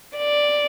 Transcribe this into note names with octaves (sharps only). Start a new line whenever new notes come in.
D5